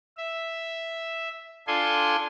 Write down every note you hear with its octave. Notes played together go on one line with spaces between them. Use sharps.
E5
D4 F4 A4 G#5 C6